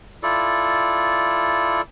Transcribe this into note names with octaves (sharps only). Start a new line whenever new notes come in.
E4 F4 A4 D5